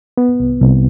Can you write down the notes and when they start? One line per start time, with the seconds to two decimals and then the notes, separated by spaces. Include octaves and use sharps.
0.17 B3
0.40 C2
0.61 C2